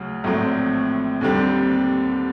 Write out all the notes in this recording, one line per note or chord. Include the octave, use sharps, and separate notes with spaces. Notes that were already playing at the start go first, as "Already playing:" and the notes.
Already playing: D2 C#3 F#3
A#1 A2 F#3 A3 C4
D#2 D3 G3 C4